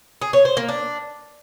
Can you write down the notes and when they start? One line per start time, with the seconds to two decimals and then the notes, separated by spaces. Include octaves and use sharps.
0.21 G#4
0.33 C#5
0.45 C5
0.57 A#3
0.69 D4